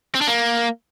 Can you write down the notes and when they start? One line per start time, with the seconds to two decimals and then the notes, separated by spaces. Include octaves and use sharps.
0.15 C4
0.21 D4
0.28 A#3